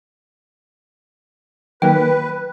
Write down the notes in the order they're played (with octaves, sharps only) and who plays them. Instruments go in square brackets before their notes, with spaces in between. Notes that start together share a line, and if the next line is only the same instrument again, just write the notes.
[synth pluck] D#3 F#3 A#3 [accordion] B4 [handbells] G5